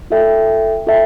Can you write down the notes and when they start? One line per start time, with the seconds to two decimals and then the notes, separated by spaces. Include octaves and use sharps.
0.10 F4 A4 E5 G5
0.87 F4 A4 E5 G5